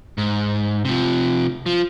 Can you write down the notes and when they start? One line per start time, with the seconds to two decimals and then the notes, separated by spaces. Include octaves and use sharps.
0.18 G#2
0.85 C3 F3
1.66 F3